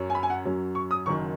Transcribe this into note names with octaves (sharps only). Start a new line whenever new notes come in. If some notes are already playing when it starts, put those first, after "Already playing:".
Already playing: F#2 F#3 C#4
G#5
B5
G#5
F#5
F#2 F#3 C#4
C#6
D#6
F#1 F#2 D#3 F#3 C#6